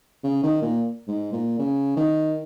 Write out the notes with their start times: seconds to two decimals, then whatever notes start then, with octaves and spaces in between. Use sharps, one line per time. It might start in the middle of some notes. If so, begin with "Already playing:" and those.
0.24 C#3
0.43 D#3
0.62 A#2
1.08 G#2
1.33 A#2
1.59 C#3
1.97 D#3